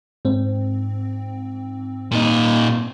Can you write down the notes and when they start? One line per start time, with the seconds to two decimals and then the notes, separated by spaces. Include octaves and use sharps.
0.25 G#2 C4
2.11 A#2 D#4